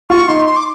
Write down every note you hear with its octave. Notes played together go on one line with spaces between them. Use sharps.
F4 C#6
D#4 C6
C6
D6